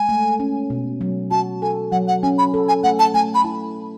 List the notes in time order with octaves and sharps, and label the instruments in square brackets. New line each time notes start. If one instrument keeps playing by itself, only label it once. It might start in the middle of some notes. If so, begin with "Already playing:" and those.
Already playing: [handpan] G#3 [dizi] G#5
[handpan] A3
C#4
B2
F#3
[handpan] F#4 [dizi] A5
[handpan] A4 [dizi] G#5
[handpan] F#3 [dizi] F#5
[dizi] F#5
[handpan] C#4 [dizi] G#5
[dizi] B5
[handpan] A4
[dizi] G#5
[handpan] A3 [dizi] F#5
[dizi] A5
[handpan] A3 [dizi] G#5
[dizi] B5
[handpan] E4